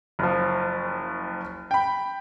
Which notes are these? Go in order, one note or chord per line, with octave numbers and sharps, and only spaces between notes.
F#1 F3
G5 B5